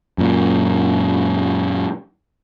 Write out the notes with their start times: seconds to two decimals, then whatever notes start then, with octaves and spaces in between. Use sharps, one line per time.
0.18 F#2 A#2